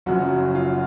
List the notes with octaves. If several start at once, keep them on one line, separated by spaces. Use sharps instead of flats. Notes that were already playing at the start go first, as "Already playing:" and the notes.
F#1 F#2 C#3 F3 F#3 F#4
F4